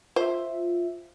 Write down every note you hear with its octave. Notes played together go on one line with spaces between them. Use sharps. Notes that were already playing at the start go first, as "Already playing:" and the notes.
F4 C5 E5